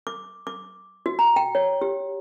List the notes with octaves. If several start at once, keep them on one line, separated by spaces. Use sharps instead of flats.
D6
D6
F#4
A#5
G5
C#5
G4